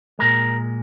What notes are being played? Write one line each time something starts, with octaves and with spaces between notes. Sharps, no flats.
A#2 G#3 A#4